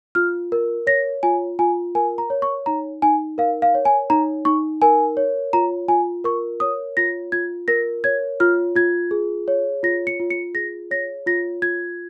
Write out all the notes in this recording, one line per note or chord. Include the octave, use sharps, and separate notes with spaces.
F4 F6
A#4
C#5 A#6
F4 G#5
F4 G#5
A#4 G#5
A#5
C#5
C#6
D#4 A#5
D#4 G#5
A#4 F5
F5
C#5
G#5
D#4 A#5
D#4 C#6
A#4 G#5
C#5
F4 A#5
F4 G#5
A#4 C#6
C#5 D#6
F4 A#6
F4 G#6
A#4 A#6
C#5 G#6
F4 F6
F4 G#6
G#4
C#5
F4 A#6
C#7
F4
C#7
G#4 A#6
C#5 A#6
F4 A#6
F4 G#6